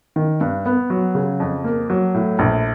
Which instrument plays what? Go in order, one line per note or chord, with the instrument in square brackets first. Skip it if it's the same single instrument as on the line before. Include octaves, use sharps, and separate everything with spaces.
[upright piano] D#3
G2
B3
F#3
C#3
F2
A#3
F#3
A2
A#1